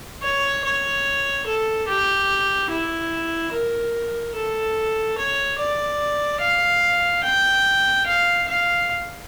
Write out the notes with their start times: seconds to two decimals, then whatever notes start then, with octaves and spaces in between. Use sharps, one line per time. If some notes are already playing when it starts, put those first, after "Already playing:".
0.23 C#5
0.65 C#5
1.46 A4
1.87 G4
2.70 E4
3.53 A#4
4.35 A4
5.18 C#5
5.58 D5
6.41 F5
7.24 G5
8.07 F5
8.48 F5